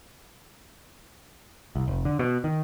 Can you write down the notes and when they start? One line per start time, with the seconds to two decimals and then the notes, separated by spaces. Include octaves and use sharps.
1.75 C2
1.88 F1
2.05 D3
2.19 B2
2.44 D#3